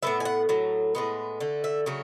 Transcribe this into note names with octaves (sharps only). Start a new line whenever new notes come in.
A2 G#3 B3 E5
G#5
F#5
A2 F#3
A2 G#3 B3
D3 A3
E5
C#3 F#3 A3